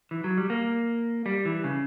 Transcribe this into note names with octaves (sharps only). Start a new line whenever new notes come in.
E3
F#3
G3
A#3
G3
E3
C#3